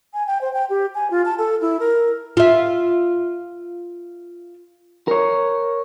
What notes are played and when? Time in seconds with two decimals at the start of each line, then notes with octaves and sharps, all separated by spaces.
0.14 G#5
0.27 G5
0.41 C5
0.53 G5
0.70 G4
0.95 G#5
1.11 F4
1.25 A5
1.38 A4
1.61 E4
1.80 A#4
2.37 F4 E5
5.08 A#4 C#5